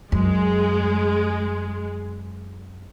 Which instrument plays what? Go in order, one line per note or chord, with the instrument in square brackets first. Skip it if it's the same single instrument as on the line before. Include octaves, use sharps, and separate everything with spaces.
[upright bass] F#2 [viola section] G#3